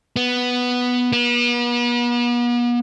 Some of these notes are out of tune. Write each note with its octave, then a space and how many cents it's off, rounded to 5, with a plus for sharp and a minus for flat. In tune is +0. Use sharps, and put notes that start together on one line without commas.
B3 +0
B3 -40